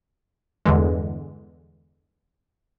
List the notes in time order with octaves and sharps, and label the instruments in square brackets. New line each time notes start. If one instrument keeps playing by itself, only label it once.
[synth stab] E2 G2 D3 E3 G#3